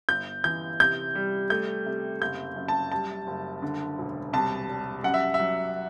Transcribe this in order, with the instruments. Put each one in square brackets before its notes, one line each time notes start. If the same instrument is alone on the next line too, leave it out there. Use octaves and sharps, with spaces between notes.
[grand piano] G1 G6
E3 G6
C3 G6
G3
A3 G6
C3
F#1 G6
F#2
A5
G3 A5
F#1
D3
E1
C2 A5
G3
F#2 F#5
E5
E5
F#3